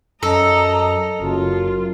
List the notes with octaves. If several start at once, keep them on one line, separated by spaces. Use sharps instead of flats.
F#2 A4 D#5 A#5
F#1 F#2 F4